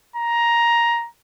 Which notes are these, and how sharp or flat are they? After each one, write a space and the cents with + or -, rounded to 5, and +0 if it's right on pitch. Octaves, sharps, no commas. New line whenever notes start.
A#5 +10